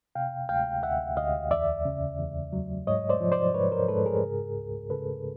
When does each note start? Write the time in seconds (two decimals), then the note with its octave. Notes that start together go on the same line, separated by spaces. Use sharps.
0.15 C3 F5 G5
0.49 D2 F5 G5
0.83 D2 E5 F#5
1.17 D2 D#5 F5
1.51 E2 D5 E5
1.85 C#3
2.19 E2
2.53 F#3
2.87 G#2 C#5 D#5
3.10 C5 D5
3.21 F3
3.32 C5 D5
3.54 G#2 B4 C#5
3.72 A#4 C5
3.88 G#2 A4 B4
4.06 G#4 A#4
4.23 C#3
4.56 C#2
4.90 C#3 A4 B4